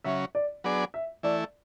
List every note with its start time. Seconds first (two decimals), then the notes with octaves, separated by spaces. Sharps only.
0.04 C#3 F#3 C#4 E5
0.35 D5
0.64 F#3 B3 D4 G#4 D5
0.94 E5
1.23 E3 A3 E4 D5